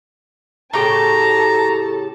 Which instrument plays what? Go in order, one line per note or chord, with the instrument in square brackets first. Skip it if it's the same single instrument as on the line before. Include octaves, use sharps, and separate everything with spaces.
[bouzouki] A2 C#3 G4 [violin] A4 A5 [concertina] A#5